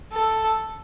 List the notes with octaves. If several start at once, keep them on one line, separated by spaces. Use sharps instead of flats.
A4